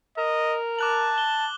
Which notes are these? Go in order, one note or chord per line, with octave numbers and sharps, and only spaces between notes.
A#4 D#5
A5 D6 F#6 F#7
G7